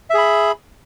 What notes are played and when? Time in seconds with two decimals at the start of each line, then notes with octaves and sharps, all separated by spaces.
0.10 E5
0.14 G#4
0.18 B5